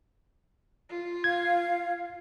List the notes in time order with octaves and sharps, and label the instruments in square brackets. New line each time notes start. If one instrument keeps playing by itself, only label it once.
[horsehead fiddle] F4
[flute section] F5 [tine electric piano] G#6